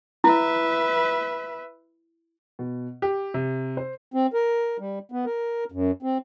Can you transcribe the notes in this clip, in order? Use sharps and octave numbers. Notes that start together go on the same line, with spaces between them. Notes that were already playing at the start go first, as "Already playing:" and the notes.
E4 B4 E5
B2
G4
C3
C5
C4
A#4
G3
B3
A#4
F#2
C4